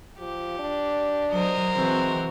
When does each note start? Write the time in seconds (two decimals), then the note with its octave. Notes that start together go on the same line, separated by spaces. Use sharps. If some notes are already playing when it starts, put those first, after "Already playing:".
0.19 F3 G4
0.59 D4
1.32 F#3 A#4 C5 D#5
1.75 E3 G#3 C4 F#4